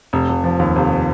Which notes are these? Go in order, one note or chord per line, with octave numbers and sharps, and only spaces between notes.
F1
F1
F3
D#2
F1